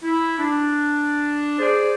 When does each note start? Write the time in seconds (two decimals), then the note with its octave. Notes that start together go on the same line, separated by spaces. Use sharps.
0.03 E4
0.38 D4
1.59 G#4 C5 D5